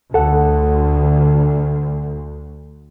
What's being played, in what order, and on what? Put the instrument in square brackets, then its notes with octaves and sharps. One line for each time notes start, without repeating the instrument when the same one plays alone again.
[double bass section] D2 [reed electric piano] A4 F#5